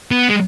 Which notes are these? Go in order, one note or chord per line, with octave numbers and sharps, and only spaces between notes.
B3
G#3